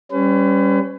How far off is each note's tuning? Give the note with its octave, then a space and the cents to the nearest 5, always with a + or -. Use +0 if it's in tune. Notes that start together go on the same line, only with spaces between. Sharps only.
G3 +0 C#4 +0 B4 +40